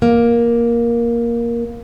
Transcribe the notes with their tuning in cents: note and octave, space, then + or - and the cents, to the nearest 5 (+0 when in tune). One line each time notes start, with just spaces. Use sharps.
A#3 +10